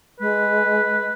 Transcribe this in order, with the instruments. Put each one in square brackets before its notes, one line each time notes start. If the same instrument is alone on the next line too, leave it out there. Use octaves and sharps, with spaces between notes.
[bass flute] G#3 [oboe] B4